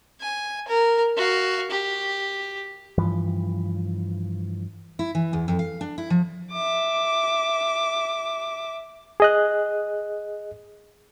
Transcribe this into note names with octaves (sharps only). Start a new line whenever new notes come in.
G#5
A#4
F#4 F5
G4
G2 E3 F3
E4
E3
E2
F2
F5
D4
E4
F3
E5 D6
G#4 D#5 F#6